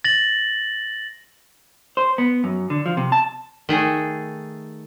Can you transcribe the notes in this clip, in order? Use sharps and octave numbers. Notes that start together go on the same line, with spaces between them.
A6 A#6 F#7
C5
B3
F#2
D3
F3
C3
A5
D#3 A3 G#4